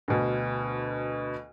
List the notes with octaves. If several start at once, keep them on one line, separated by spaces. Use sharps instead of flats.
D2 B2